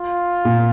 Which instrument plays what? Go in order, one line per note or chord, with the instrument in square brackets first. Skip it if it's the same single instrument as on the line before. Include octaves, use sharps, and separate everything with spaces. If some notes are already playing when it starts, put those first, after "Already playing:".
Already playing: [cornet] F4
[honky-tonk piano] A#2